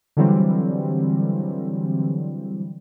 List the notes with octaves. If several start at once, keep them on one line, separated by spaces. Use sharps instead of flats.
D3 E3 F#3 G3 C4